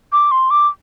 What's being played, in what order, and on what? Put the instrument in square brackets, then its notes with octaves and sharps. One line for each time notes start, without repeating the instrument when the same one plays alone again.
[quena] D6
C6
D6